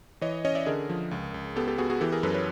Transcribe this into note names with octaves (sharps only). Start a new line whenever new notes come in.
E3 C#5 D#5
C#4 C#5 D#5
D5 E5
D3 G#4 A#4
F3
C#2
C#2
B3 G4 A4
G4 A4
B3 F#4 G#4
F#4 G#4
E3 G4 A4
G#4 A#4
F#2 A4 B4
B4 C#5